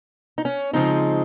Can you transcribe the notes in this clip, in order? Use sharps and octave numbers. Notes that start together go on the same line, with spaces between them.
D#4
C#4
C#3 F3 G#3 C4 D#4